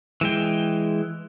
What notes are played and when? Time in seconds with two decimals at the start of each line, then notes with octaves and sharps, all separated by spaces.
0.21 E3 G#3 G5